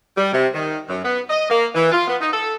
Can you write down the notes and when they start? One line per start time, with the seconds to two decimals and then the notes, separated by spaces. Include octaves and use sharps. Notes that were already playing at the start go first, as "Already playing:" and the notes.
0.17 G3
0.33 C3
0.54 D#3
0.88 F#2
1.04 B3
1.29 D#5
1.50 A#3
1.75 E3
1.92 F4
2.08 B3
2.20 D#4
2.33 A4